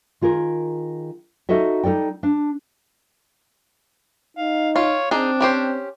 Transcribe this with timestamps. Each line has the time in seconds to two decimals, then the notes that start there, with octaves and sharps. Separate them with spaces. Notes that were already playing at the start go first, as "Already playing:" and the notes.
0.21 D#3 F4 G#4 A#4
1.49 D#4 F#4 A4 D#5 E5
1.83 G3 D#4 A4 D5 G5
2.23 D4
4.37 D#4 F5
4.76 F4 C#5
5.11 C4 D4 D#4 G#4
5.41 C#4 G4 C5